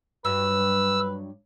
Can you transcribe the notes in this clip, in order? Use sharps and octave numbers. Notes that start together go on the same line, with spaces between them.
G2 F#3 B4 E6